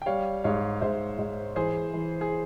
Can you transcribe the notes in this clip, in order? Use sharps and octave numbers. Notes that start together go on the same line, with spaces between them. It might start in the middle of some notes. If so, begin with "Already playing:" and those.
G5
G3 C#5 F5
G#2 C#5 F5
G#2 C5 E5
G#2
E3 G#4 C5
E3
G#4